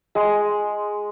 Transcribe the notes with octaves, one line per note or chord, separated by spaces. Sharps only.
G#3